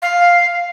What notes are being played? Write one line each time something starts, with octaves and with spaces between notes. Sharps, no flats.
F5